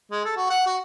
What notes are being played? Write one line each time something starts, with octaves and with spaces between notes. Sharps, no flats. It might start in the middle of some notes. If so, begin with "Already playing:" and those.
G#3
A4
F#4
F#5
F#4